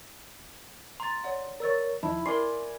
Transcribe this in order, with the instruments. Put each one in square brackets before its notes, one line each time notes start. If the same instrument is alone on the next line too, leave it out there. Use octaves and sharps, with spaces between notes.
[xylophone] A#5 A6 [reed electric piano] C6
[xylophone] C#5 D5 F#5
[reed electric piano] A#4 C#5 [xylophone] D5 E6 A6
[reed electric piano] D#2 F3 D#4 [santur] E4 [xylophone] A5
[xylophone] A#4 C7 [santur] D5 G#5 D#6 [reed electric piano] C6